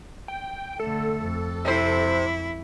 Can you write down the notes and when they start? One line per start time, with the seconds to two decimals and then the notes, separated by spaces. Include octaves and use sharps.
0.28 G5
0.80 D3 A3 A4
1.22 F2
1.65 C3 E4 C5